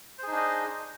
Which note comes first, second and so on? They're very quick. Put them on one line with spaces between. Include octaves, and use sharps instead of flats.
C5 G#4 D#4 D4 D#5